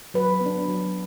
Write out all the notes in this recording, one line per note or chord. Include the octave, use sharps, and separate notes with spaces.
F#3 B4
B3
D4
F#3